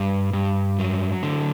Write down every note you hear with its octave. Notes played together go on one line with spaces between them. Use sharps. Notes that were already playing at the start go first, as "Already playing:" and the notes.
Already playing: G2
G2
F#3
D3